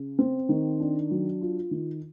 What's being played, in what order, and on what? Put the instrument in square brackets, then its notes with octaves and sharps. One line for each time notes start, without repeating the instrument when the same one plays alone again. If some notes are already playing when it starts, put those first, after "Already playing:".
Already playing: [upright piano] C#3
C4
D#3
D4
F#3
F4
D#3